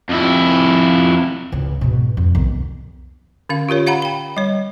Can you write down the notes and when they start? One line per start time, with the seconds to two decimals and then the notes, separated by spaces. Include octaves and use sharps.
0.09 F2 E4
1.52 C#2
1.81 G#2 B2
2.17 F2
2.35 B1 D#3
3.49 D3 C#4 F5
3.69 F4 G4 A#4 C#5
3.86 C#5 F5 F#5 A#5 B5
4.02 G5 B5
4.37 G3 C#5